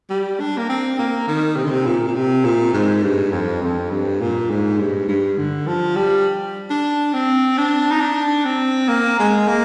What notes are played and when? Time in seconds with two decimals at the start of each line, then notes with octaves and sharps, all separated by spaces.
0.10 G3
0.40 D4
0.57 A#3
0.69 C4
0.99 A#3
1.27 D#3
1.56 C3
1.65 D3
1.71 C3
1.86 A#2
2.08 A#2
2.15 C3
2.44 A#2
2.73 G#2
3.03 G2
3.32 F2
3.62 F2
3.91 G2
4.21 A#2
4.50 G#2
4.78 G2
5.08 G2
5.37 D3
5.67 F3
5.96 G3
6.70 D4
7.13 C4
7.58 D4
7.91 D#4
8.01 D4
8.45 C4
8.88 A#3
9.19 G#3
9.47 A#3